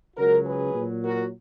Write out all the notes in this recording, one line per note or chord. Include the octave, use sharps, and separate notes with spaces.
C#2 C#3 F#3 F#4 A#4
G#4 B4
A#2 F#3
F#4 A#4